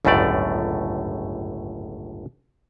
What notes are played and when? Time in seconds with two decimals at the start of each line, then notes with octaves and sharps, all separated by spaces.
0.05 G1 C#2 F#2 A2 A3 D5